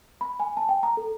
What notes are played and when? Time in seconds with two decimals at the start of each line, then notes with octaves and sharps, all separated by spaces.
0.21 B5
0.40 G#5
0.57 A5
0.69 G5
0.83 A#5
0.97 A4